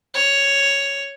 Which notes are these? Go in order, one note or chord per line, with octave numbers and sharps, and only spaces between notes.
C#5